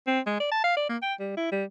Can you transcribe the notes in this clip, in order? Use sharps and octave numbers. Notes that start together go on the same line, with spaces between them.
C4
G#3
D5
A5
F5
D5
A#3
G5
G3
E4
G3